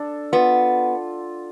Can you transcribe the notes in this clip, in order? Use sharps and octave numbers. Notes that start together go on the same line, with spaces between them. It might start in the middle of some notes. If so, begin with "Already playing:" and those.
Already playing: D4 A4
B3 F4